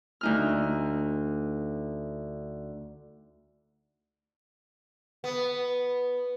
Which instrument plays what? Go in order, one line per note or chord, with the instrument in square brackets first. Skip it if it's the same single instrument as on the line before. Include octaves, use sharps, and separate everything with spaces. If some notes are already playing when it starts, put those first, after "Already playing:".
[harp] D2 D#4 F6
[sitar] B3